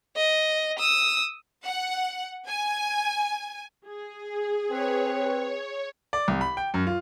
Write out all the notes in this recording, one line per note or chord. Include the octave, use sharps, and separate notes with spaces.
D#5
D#6 E6
F#5
G#5
G#4
C4 B4 C#5
D5
C2
B5
G5
F#2
F4